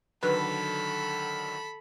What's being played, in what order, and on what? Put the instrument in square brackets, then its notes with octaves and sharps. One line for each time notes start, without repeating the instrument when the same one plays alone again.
[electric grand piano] D3 D#3 F#3 [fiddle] A4 B5 [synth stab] B4